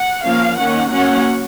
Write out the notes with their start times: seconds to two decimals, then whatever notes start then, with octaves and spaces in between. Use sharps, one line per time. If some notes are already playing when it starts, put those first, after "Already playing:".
Already playing: F#5
0.24 F3 A#3 C#4 F5
0.58 D#3 A#3 C#4 F#5
0.92 F#3 A#3 C#4 F#5